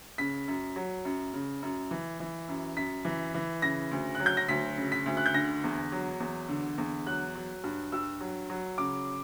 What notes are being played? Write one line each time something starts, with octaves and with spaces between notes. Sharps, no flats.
C#3 B6
F#2
F#3
F#2
C#3
F#2
E3
E3
F#2
F#2 B6
E3
E3
C#3 A#6
D2
F#3 F#6
G6
A#6
D2 B6
C#3
B6
D2
F#6
G6
D3 A#6
E2
F#3
E2
D3
E2
F#3 F#6
F#3
G2
G2 E6
F#3
F#3
C#3 D6